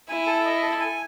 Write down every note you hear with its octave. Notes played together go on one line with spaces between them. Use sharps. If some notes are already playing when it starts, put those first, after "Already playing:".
E4 G#5
A4
D#5
A4
G#5